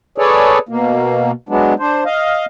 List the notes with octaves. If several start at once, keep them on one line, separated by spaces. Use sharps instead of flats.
G#4 A4 B4 C#5 D5
B2 A#3
F#3 G#3 B3 D4
D4 C5
D#5 F5